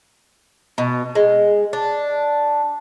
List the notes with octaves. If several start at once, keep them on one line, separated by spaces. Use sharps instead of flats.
B2
G#3
D4